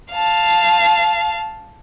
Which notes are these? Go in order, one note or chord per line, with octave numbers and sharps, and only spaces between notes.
F5 A5